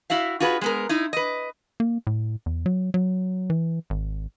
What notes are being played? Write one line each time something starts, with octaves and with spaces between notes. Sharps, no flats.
E4 F#4 E5 F5
F4 F#4 G#4 B4
G#3 B3 A#4
D#4 E4
B4 D#5
A#3
A2
E2
F#3
F#3
E3
G#1